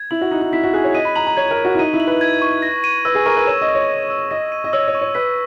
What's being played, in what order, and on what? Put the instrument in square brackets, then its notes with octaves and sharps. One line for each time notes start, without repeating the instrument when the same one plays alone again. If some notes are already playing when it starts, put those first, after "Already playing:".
Already playing: [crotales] G#6
[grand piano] E4 [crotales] F#7
[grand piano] F#4
[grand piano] D#4 [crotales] F#6
[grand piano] D#4
[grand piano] E4 [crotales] B6
[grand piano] F#4
[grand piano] G#4 [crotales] F#6
[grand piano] C#5
[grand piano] D#5 [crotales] D#7
[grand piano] B5
[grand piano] A#5 [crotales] F#7
[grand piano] A#5
[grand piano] C#5 [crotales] G#6
[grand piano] A#4
[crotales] C#6
[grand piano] F#4
E4
[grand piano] D#4 [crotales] D#7
[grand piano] E4
[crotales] F#7
[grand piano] B4
[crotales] G#6
C#6
A#6
D#7
[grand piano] B4 [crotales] E6
[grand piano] G#4
[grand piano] A#4 [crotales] C#6
[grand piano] B4
[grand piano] C#5 [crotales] E7
[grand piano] D#5
[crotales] E6
[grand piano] C#5
[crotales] A#6
E6
[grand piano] D#5 [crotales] A#6
[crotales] D#7
[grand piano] D#5
[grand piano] C#5 [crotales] E6
[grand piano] C#5
[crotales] C#6
[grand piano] C#5
[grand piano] B4 [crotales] B6